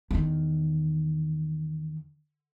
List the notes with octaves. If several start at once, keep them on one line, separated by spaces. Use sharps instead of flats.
E2 D#3